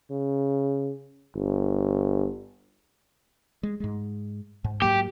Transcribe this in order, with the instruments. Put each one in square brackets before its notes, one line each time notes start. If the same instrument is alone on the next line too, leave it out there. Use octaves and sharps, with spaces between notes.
[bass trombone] C#3
G1
[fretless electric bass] G#3
G#2 G#3
G#2
[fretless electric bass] G#2 F#3 A#3 [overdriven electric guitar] G4